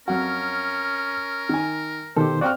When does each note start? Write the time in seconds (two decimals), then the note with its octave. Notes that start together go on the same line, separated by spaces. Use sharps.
0.08 F2 F#3 C#4 F#4 A#4
1.49 D#3 G#5
2.16 B2 D#3 D#4 G4 A4 C5
2.41 C4 F#4 D5 F5 G5 F6